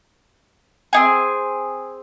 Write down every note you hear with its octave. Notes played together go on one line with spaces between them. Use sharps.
C4 D#4 G#4